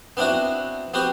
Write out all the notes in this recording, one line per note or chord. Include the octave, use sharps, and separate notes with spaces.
B3 C4 D4 E4 F#4
B3 C4 F#4 G4